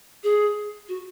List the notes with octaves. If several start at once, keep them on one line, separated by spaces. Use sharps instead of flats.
G#4
F#4